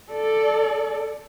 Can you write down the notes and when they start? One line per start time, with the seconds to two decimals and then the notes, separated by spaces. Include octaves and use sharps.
0.12 A4 D5